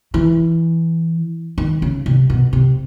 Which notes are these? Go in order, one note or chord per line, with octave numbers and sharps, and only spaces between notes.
E3
D#3
C#3
C3
B2
C3